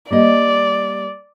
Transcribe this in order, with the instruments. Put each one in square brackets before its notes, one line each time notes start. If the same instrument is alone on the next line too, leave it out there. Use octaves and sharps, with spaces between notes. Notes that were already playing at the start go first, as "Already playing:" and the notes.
[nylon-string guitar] G3 A#3 D#5 [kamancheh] D5